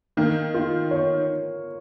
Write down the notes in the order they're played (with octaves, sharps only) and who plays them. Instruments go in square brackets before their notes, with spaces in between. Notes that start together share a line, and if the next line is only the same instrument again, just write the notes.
[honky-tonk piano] D#3 [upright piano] A#3
[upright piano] F4
C#5